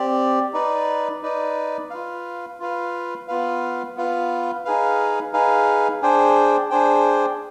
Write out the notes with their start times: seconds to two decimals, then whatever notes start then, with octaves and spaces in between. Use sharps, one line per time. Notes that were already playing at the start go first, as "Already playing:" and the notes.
Already playing: C4 G4 D5
0.54 D#4 B4 D5
1.23 D#4 B4 D5
1.90 F4 B4 F5
2.60 F4 B4 F5
3.28 B3 F4 B4 F5
3.96 B3 F4 B4 F5
4.65 D#4 G#4 B4 F5
5.33 D#4 G#4 B4 F5
6.02 D4 G#4 C5 G5
6.70 D4 G#4 C5 G5